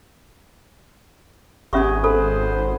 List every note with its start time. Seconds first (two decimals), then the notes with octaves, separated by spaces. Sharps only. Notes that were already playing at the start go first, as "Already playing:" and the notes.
1.73 G#1 B3 C#4 G4 G#4 E5 C#6
2.04 A4 B4 C5